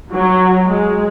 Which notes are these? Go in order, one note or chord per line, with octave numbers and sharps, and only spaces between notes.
F#3
G#3